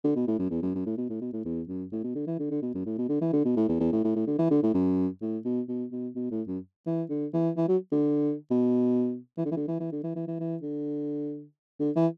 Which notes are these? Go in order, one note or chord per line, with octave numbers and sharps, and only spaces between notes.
D3
B2
A2
F#2
E2
F#2
F#2
A2
B2
A2
B2
A2
E2
F#2
A2
B2
D3
E3
D3
D3
B2
F#2
A2
B2
D3
E3
D3
B2
A2
E2
E2
A2
A2
A2
D3
E3
D3
A2
F#2
A2
B2
B2
B2
B2
A2
F#2
E3
D3
E3
E3
F#3
D3
B2
E3
D3
E3
D3
E3
E3
D3
E3
E3
E3
E3
D3
D3
E3